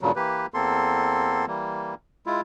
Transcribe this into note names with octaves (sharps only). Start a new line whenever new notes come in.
G2 A#2 C#3 F#3
E3 A#3 G4 B4
E2 A#3 C4 A4 C6
E3 G3 A#3
G#3 E4 F4